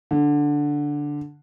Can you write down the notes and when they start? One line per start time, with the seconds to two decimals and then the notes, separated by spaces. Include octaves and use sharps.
0.11 D3